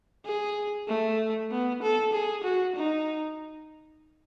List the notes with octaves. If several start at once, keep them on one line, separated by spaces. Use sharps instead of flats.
G#4
A3
B3
A4
G#4
F#4
D#4